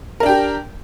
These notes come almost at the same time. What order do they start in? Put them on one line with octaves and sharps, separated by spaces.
A#4 D4 G5 G4